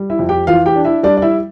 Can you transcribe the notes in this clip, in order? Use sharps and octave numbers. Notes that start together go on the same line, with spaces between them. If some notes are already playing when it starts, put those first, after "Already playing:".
Already playing: G3
E4 E5
F2
G4 G5
E3 F4 F5
G4 G5
D4
E4 E5
G3 D4 D5
D5
E4 E5